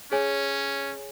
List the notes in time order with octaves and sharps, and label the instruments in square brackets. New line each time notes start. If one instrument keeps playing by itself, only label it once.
[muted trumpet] C#4 [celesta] G#4 C#5 G#5